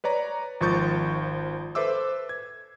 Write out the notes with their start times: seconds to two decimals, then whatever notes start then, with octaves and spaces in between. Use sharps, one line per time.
0.04 B4 C#5 D5 A#5
0.61 G#1 F3 C#6 G6 A6
1.75 A4 B4 C5 E5 D6 E6
2.29 G#6